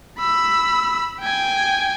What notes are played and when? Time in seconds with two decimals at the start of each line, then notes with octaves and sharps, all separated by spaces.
0.19 B5 E6
1.21 G5 G#5